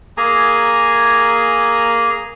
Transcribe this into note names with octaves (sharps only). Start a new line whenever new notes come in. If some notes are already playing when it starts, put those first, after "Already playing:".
A#3 G#4 G#5 A#5